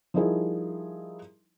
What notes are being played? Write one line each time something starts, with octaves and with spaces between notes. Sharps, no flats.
F3 G3 D#4 E4 G#4 A#4